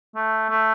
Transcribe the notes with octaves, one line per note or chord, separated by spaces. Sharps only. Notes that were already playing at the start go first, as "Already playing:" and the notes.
A3
A3